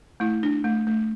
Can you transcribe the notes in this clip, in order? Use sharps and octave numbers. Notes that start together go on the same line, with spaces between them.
A3 E4
D4
A3
A3